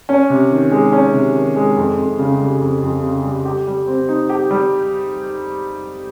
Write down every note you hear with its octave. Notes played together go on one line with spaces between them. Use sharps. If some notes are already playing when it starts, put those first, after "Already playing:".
C#4
C3
D#3
G#3
C#4
C3
D#3
G#3
F2
F2
C#3
G3
F2
F2
C#3
G3
G4
G3
C4
D#4
G4
G3